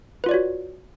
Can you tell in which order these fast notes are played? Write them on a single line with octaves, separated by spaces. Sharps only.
B4 F4 D5 C#5 F#4